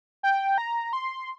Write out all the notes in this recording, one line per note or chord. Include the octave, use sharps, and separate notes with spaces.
G5
A#5
C6